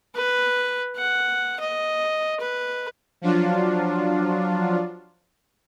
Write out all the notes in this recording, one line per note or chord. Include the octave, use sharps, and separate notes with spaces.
B4
F#5
D#5
B4
F3 F#3 D4 F4